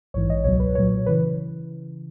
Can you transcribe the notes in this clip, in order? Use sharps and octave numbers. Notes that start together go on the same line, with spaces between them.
A#1 G#2 E3 C#5
D#5
C#2 B2 F#3 C#5
B4
B1 A#2 F#3 C#5
C#3 E3 B4